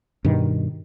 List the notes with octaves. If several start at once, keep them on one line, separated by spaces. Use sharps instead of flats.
G2 B2 D#3